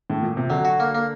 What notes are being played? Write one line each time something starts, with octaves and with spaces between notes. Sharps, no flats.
A2
A#2
C3
D3 F#3
F#4
A#3
A#3